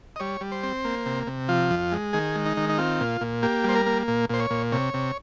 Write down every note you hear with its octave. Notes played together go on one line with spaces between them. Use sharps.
D#5
G3 C#5
G3
C5
C4
A#3
C3
C3
F3 F4
F2
G#3
D#3 G#4
G#3
D#4
D#3
D#4
C4 F4
A#2
A#2
A#3 G4
G3 C5
A#4
A#3
A#2
A#2 C5
C#5
A#2
C3 C#5
C3